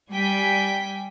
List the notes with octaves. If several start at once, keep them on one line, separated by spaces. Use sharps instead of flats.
G3 G5 G#5 B6